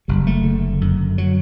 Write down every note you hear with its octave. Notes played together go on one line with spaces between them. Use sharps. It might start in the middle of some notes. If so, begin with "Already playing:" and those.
F#1 G3
A3
D3
F#2
F#3